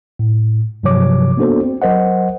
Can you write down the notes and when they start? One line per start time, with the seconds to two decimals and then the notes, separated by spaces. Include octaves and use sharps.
0.19 A2
0.83 G2 C3 F3 F#3 C#5 D6
1.37 A#3 B3 D4 F#4 A4 C5
1.63 C4
1.82 F#3 A#4 C5 D#5 F#5